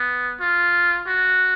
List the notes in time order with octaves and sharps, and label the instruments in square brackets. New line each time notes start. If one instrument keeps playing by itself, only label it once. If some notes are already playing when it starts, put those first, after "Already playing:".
Already playing: [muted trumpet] B3
F4
F#4